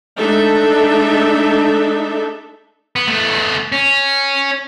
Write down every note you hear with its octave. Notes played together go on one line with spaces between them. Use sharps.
G#3 A3 D4 D#4 A4 E5
B3
A3 B3
C#4